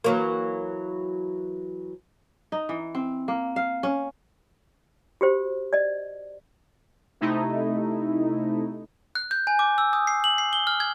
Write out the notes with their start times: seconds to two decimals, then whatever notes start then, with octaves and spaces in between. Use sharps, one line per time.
0.04 E3 F#3 A#3
2.52 D#4
2.69 E3
2.95 C4
3.28 A#3
3.56 F5
3.83 C#4
5.21 F#4 G4 C5
5.73 D5 D#5
7.21 C3 A3 D#4 E4
9.15 F#6
9.31 G6
9.47 G#5
9.59 D6
9.78 E6
9.93 D#6
10.07 C7
10.24 F#7
10.38 C7
10.53 G7
10.67 F6
10.80 G#6